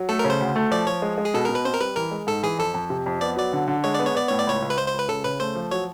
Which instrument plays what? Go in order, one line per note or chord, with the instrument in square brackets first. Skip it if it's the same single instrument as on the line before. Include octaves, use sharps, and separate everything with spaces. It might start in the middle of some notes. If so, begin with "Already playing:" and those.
Already playing: [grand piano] F#3
[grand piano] A3 [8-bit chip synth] A4
[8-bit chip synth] A#4
[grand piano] C#3
[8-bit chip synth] C5
[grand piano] D2
A3
[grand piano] F3 [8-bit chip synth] D5
[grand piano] F3 [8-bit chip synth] C#5
[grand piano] G#3
G#3
[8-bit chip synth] G#4
[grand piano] B2 [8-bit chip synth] A4
[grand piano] B2 [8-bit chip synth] A#4
[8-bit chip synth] B4
[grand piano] C4 [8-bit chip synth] C5
[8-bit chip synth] A#4
[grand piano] G3 [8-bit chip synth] B4
[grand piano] E3 [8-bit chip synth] A#4
[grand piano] G#3
[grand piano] G#2 [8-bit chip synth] A4
[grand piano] E3 [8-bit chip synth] G#4
[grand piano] F2 [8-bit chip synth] A4
[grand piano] F2
C3
F2
[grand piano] B3 [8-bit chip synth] D5
[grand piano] F#3 [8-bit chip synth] D5
[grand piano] D3
D3
[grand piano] G#3 [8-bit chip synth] C#5
[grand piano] B3 [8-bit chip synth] D5
[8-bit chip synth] C#5
[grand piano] B3 [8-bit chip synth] D5
[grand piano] A2 [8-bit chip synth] C#5
[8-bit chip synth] D5
[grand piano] C#2 [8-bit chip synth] C#5
[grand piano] C#2
[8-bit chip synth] B4
[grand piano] C#2 [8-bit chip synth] C5
[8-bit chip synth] C5
[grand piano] C#2 [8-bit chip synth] B4
[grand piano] C#3 [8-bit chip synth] A4
[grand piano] C#3 [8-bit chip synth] B4
[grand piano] A3 [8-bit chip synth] C5
[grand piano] F3
[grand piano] F#3 [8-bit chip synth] C#5